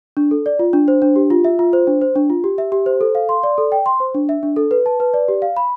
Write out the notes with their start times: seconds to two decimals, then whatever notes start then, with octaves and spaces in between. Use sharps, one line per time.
0.17 D4
0.31 A4
0.46 D5
0.59 F4
0.73 D4
0.88 C5
1.02 D4
1.16 G4
1.30 F4
1.44 E5
1.59 F4
1.73 C5
1.87 D4
2.01 C5
2.16 D4
2.30 F4
2.44 G4
2.58 E5
2.72 G4
2.86 C5
3.01 A4
3.15 F5
3.29 C6
3.43 D5
3.58 A4
3.72 G5
3.86 C6
4.00 C5
4.15 D4
4.29 E5
4.43 D4
4.56 A4
4.71 B4
4.86 A5
5.00 B4
5.14 D5
5.28 G4
5.42 F5
5.57 B5